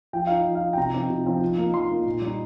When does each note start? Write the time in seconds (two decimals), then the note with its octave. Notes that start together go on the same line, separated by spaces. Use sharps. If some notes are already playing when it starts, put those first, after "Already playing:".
0.13 F3 G5
0.27 D#4 F5
0.45 F3
0.55 F5
0.62 D#4
0.73 G5
0.77 C3 A#5
0.94 F3 C4 D#4
1.10 C3
1.25 F3 C4 D#4
1.41 F3
1.58 A#3 D#4
1.74 F3 C6
1.90 A#3 D#4
2.06 A#2
2.22 G3 D#4